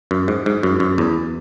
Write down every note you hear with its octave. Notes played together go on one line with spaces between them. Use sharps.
F#2
G#2
G#2
F#2
F#2
E2